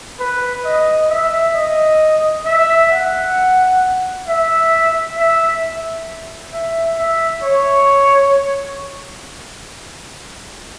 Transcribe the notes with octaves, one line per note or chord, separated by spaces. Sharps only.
B4
D#5
E5
D#5
E5
F#5
E5
E5
E5
E5
C#5